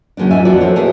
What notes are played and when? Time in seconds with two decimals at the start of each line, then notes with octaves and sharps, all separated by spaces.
0.17 C#3 F#3 G#3 A#3 D4
0.31 G#2 F4 D5 E5 G#5
0.45 E2 F3 E4 F#4 B4 D5
0.60 A4 C5 C#5
0.76 A#2 G#4 A#4 B4 E5